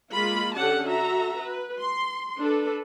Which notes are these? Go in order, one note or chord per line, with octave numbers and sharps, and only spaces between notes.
G#3 A#3 F4 B5
D3 C#4 G4 A4 F#5 A5
F#4 A4 E5 A#5
B4
C6
D4 A4 B4